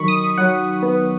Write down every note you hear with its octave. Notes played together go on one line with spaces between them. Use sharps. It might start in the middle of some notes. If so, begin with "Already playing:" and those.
Already playing: D#3 F#3 B5 C#6
D#6
F#3 F#5
B3